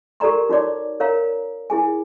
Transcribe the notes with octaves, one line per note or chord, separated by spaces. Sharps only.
G4 A4 A#4 D5 A#5 C6
D#4 F#4 C#5 D5 D6
A#4 C#5 F5 A#5
E4 G#4 G#5